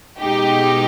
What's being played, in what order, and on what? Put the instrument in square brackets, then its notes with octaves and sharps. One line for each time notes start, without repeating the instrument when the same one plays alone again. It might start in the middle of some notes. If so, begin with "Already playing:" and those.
[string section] B2 G#3 D#4 G4